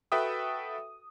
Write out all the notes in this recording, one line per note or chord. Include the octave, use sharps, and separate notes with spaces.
F#4 A4 B4 E5 G5 D#6